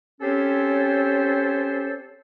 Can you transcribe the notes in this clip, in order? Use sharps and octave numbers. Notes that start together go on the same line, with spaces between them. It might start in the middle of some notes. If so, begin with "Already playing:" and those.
C4 C#4 G4 A4 C5 C#5